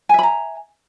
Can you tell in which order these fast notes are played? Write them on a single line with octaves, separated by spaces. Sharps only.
G#5 E5 B5 A#5